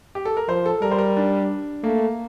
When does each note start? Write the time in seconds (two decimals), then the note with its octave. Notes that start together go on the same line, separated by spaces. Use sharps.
0.15 G4
0.25 A4
0.37 A#4
0.49 F3 C5
0.66 A4
0.82 G3 A#4
0.91 C5
0.98 A#4
1.17 D4
1.84 A3 A#3